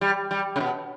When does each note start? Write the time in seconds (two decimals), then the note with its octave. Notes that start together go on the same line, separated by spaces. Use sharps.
0.01 G3
0.31 G3
0.56 C#3
0.60 B2